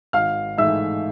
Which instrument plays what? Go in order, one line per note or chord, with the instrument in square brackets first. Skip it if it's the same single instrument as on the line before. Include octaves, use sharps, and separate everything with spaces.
[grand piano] G#1 F5 F6
G#2 E3 A3 E5 E6